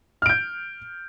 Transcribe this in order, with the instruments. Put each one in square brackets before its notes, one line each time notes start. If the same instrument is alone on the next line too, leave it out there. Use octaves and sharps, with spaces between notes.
[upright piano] F6
D7
G6